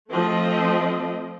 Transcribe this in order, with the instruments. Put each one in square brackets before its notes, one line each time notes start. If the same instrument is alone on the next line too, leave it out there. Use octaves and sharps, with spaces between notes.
[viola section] F3 A3 C4 D#5